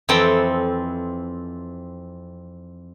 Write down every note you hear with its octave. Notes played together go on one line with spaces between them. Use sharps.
F2 E3 C4 A4 G5 A#5